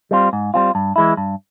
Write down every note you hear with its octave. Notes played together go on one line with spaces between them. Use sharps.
G3 C4 F4
G#2
G3 C4 F4
G2
E3 G#3 E4
G2